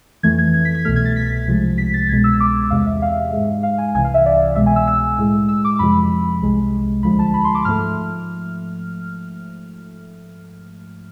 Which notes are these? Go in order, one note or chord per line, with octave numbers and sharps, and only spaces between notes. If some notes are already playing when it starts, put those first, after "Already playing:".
F2 E3 A3 G#6
G#6
G#6
B6
G#6
C2 B2 A3 F6
G#6
A6
B6
C2 C3 F3 G#3
B6
A6
C2 B2 G#3 G#6
E6
D6
E2 C3 G#3 F5
E5
F5
G#2 G#3
F5
G#5
C2 C3 E3 G#5
F5
E5
D5
C2 B2 G#3 E5
G#5
E6
E6
A2 G#3
E6
D6
F2 C3 F3 G#3 B5
C2 C3 G#3
D2 D3 F3 G#3 B5
A5
B5
C6
D6
G#2 F3 A3 F6